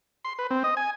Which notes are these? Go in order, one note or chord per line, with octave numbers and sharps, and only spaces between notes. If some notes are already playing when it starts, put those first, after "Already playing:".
C6
B4
C4
D#5
G#5